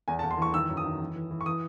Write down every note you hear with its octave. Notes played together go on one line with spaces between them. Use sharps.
E2 G#5
A5
E2
C6
E3 C#6
D#3 E6
F#2
D#6
D#3
E3
E3
E3
C#6
E3 D#6